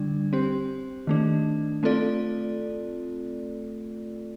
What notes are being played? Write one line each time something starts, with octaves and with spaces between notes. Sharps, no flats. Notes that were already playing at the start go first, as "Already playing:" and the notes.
Already playing: D3 G3 D4
C4 G4 C5
D#3 A3 D4
A3 C4 F4 A4 D5